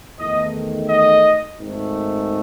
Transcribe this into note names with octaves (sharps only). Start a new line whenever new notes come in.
E2 D#3 A3 D#5
D#5
G#1 G#2 D#3 A3